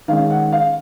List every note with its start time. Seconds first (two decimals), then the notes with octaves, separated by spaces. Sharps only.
0.08 D#3 G#3 C#4 F5
0.30 F#5
0.52 F5